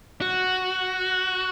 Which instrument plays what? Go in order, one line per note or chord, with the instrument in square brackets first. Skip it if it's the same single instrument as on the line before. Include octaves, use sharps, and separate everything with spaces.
[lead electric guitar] F#4